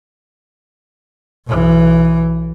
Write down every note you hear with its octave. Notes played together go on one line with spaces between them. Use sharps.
B1 E3